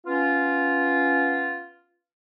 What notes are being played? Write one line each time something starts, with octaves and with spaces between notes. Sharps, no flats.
B3 C#4 F4